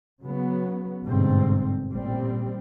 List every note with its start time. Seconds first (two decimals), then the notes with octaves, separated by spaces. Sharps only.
0.22 C#3 F#3 B3
1.06 G1 G#2 B2 D3 C4
1.92 A1 A#2 G3 C4